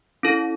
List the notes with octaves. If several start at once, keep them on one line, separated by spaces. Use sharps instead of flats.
C#4 E4 A4